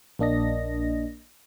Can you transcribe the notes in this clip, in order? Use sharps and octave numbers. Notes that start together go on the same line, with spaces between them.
A#1 A#3 D4 D#5 A#6